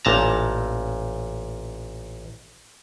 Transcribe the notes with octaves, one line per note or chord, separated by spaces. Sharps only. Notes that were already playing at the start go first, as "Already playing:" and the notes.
A1 A#2 A5 A#5